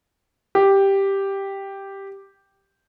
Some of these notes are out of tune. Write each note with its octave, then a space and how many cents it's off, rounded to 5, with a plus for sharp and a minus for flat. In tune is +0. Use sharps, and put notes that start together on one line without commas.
G4 +0